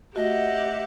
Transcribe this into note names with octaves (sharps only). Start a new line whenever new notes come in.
A3 F#4 G4 D#5 E5 F#5